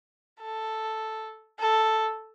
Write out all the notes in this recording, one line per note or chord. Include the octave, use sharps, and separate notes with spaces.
A4
A4